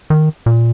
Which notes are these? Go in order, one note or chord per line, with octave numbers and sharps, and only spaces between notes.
D#3
A#2